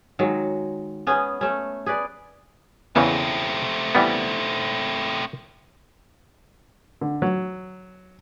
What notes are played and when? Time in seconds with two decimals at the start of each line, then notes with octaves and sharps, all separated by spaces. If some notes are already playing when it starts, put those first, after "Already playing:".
0.19 D#3 F#3 G#3
1.07 B3 C#4 G#4
1.41 A3 C#4
1.86 G#4 B4 D5
2.96 E2 C#3 E3 A3 C4
3.95 E3 G3 B3
7.01 D3
7.22 F#3